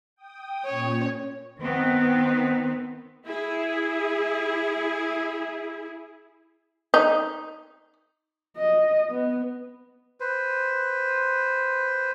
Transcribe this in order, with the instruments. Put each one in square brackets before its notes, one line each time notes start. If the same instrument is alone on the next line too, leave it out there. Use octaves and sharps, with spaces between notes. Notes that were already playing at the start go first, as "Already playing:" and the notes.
[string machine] G5 D#6
[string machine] A#2 C#4 [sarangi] C#5
[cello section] D#3 B3 C4
[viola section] E4 G#4
[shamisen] D#4
[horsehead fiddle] D#5
B3
[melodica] B4 C5